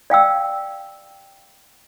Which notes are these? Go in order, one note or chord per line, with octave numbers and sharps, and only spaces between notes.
D5 F5 G5 E6